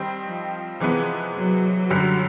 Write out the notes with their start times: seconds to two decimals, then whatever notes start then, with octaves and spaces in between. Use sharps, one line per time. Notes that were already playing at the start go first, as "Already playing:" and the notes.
Already playing: D#3 G3 C4 D#4
0.25 F3
0.80 C3 E3 G#3 B3
1.35 F#3
1.90 F#2 D3 G3